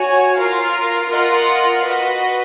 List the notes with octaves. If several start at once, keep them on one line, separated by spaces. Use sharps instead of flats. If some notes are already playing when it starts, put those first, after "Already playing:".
Already playing: F#4 C#5 G#5
F4 A#4 F5
F4 A#4 D#5 F#5
F#4 B4 D#5